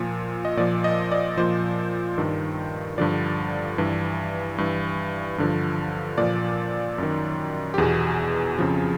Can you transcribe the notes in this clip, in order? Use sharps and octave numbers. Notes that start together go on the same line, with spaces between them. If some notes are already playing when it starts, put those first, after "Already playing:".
Already playing: A#2 F3
D#5
A#2 F3 D5
D#5
D5
A#2 F3 C5
G2 D#3
G2 D3 F3 D5
G2 E3
G2 E3
G2 D3 F3
A#2 F3 D5
F#2 D#3
G4
E2 B2 G#4
F2 C#3 F3